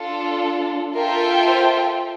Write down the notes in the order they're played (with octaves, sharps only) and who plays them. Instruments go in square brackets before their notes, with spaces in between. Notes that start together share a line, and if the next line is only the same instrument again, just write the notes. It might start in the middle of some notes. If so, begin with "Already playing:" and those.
Already playing: [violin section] D4 F4 A4
[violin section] F4 A4 E5 G5 [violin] A#4
[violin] C5